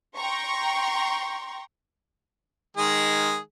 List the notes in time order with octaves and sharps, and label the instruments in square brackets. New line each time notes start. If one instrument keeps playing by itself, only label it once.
[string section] G5 A#5 C6 C#6
[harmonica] D#3 G#3 G#4